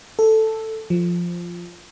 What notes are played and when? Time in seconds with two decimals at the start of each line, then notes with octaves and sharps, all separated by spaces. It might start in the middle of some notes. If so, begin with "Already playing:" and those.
0.19 A4
0.90 F3